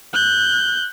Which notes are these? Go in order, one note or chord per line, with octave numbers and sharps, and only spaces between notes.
F#6 G6